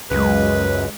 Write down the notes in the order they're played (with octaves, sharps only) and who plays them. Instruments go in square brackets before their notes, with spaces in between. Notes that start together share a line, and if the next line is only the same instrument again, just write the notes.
[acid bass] C#2 [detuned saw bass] F#2 [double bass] G#3 [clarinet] B4